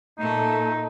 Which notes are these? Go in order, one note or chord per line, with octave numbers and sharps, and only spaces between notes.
A#2 A3 D#4